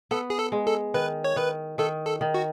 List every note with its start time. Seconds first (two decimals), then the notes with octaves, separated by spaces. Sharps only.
0.11 B3 A4
0.30 G#4
0.39 A4
0.52 G#3
0.67 A4
0.94 D#3 B4
1.24 C#5
1.36 D#3 B4
1.78 D#3 A4
2.06 A4
2.21 D#3
2.34 F#4